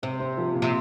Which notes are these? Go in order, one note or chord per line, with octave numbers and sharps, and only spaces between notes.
C3 C4
C4
F3
A#2
C3